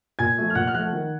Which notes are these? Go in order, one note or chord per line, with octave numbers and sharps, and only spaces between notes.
A#2 G#5 G#6
F3 A3
F6
A#2 F#5 F#6
F6
F3 A3 F#5 F#6
D#3